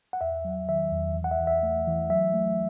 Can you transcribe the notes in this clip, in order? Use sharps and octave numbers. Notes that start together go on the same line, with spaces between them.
F#5
E2 E5
F#3
D#3 E5
E2
E3
F#5
E5
E3
E5
A3
E3
F#3 E5
A3